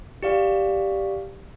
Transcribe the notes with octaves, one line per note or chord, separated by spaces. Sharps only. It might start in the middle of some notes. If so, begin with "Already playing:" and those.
G4 D5 F5